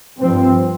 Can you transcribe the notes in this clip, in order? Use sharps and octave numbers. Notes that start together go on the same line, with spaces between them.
G2 F3 C4